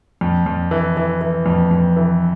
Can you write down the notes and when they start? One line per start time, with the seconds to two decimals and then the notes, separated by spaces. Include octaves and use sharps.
0.21 F2
0.46 F2
0.71 E3
0.97 E3
1.21 E3
1.46 F2
1.71 F2
1.97 E3